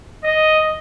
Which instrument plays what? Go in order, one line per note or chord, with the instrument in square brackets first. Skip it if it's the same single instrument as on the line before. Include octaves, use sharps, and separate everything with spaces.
[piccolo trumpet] D#5